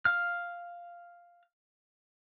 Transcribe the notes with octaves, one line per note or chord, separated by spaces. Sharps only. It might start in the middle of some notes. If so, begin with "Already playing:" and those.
F5 F6